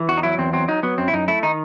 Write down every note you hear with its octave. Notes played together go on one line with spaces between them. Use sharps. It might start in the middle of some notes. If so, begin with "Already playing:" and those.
Already playing: E3
E2 F#4
D#4
F#3 E4
E2 C4
F#3 C4
F#3 D#4
F#3 B3
F#2 C4
E4
F#2 D#4
A3 E4
D#3 D#4